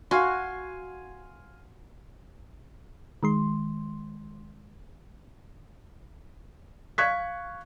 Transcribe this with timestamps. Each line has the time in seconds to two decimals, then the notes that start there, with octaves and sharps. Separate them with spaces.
0.11 F#4 F5 G#5 C6
3.23 D#3 G#3 C6
6.98 F5 C#6 F#6 G#6 B6